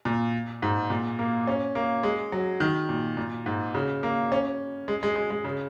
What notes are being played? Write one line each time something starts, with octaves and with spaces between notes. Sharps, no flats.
A#2
G#2
A#2
A#3
C#4
A#3
G#3
F#3
D#3
A#2
A#2
G#2
C#3
A#3
C#4
G#3
G#3
G#3
G#3
C#3